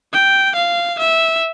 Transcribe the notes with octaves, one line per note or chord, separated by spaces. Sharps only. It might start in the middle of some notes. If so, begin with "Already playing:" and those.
G5
F5
E5